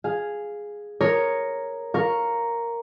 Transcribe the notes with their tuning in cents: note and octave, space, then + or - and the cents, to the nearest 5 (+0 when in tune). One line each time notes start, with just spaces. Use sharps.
G#4 +0 F5 +0
A#4 +0 C#5 +0 D#6 -5
A#4 +0 F5 +0 C#6 +0